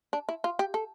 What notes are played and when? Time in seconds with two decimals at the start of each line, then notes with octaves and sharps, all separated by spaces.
0.13 D4
0.29 E4
0.44 F4
0.59 G4
0.74 A4